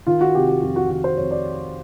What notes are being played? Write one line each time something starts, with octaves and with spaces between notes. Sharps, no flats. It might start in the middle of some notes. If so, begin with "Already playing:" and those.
D#3 F4
F#4
C3 G4
G4
F2 F#4
F#4
D#3 F#4
C5
F2 C#5
D5